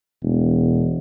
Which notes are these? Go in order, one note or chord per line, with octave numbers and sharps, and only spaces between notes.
E1